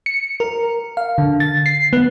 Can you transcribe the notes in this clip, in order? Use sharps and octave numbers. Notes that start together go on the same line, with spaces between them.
C#7
A#4
F5
D3
A6
C7
B3